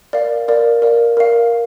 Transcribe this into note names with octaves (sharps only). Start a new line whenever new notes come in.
A#4 D5 F5
A#4 D5 F5
A#4 D5 F5
A#4 D5 F5